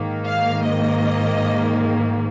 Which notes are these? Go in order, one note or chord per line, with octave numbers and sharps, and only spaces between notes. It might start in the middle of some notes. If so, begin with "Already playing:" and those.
Already playing: G#2 D#3 A#3
F5
D#5